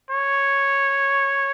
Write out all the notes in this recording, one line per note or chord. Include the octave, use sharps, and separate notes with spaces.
C#5